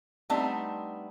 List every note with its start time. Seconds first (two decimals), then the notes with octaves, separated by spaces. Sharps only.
0.30 G3 A3 B3 C4 D4 D#4